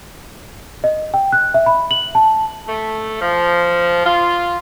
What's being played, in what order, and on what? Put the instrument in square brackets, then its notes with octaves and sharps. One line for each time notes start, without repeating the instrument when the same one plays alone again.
[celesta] D#5
G5
F#6
E5
B5
F#7
A5
[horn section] A3
F3
F4